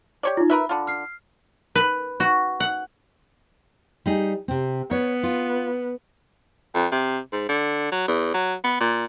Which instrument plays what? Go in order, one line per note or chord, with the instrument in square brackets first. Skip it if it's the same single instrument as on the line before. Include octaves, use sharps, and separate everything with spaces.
[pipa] G4 C#5 D5
[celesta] D#4 F4
[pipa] A#4 B4 E5 [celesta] B5
[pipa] D3 F4
[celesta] F6 C7
[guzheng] B4
F#4
F#5
[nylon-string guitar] G3 D#4 G#4
C3 C4
[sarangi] B3 [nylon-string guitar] C#5
[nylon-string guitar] F4
[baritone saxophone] F2
C3
G#2
D3
F#3
E2
F#3
B3
A#2